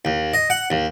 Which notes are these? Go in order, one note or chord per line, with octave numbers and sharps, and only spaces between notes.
D#2
D#5
F#5
D#2